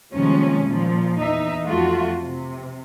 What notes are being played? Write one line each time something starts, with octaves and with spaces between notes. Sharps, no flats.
D#2 C3 F3 G3 G#3 C#4
A#2 F3
E2 D#4 E5
F2 A3 F4 F#4
C3